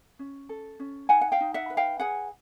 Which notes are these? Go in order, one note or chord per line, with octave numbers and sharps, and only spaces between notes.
C#4
A4
C#4
D#4 F#5 G#5
F#5
F5 G5
D#4
E5 F#5
B4
F5 G5
G#4 F#5 G#5